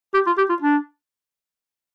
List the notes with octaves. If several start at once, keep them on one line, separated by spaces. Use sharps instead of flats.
G4
F4
G4
F4
D4